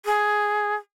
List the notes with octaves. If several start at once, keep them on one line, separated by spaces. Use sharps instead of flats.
G#4